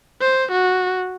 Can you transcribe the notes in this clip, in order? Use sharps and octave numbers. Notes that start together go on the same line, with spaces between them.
C5
F#4